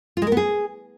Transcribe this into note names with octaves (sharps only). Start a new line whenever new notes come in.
F4
G#3
A#4
B3
G#4